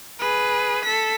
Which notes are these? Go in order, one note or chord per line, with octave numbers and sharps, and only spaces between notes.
G#4 B4
A4 B6